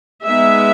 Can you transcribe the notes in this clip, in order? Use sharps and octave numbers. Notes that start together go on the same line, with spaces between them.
G#3 B3 D#4 E5